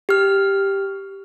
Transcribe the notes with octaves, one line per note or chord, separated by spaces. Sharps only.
G4 F6